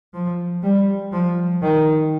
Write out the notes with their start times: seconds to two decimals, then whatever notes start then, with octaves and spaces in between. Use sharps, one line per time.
0.14 F3
0.63 G3
1.12 F3
1.62 D#3